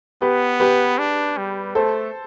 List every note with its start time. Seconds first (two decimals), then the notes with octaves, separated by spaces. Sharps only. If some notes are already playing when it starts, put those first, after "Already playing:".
0.22 B3 G4 B4
0.60 G4 B4
0.98 D4
1.37 G3
1.75 A3 A4 C5